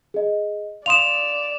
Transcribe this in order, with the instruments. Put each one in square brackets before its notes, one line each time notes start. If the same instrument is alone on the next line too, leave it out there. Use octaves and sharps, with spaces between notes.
[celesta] G#4 D#5
[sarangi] D5 [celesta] F5 C6 D#6 [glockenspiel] E7 F7